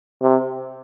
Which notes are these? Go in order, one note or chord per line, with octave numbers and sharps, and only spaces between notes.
C3